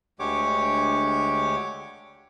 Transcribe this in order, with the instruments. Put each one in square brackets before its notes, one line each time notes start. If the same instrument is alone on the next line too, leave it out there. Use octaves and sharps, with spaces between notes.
[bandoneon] D2 D3 G#3 G4 C#5 D6